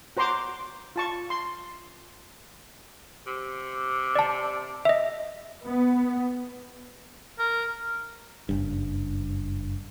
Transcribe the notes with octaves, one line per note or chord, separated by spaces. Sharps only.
F#4 C5 A#5 C6 D6
F4 A5 C#6
C6
C3
D5 A5
D#5 E5
B3
A#4
F#1 G2